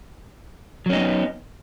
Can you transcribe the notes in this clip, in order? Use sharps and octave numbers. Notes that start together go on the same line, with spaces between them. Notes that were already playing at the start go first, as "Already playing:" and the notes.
F#3 A#3 B3 C#4 D#4